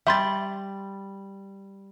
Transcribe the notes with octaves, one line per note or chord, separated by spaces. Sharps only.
G3 E5 C6 A6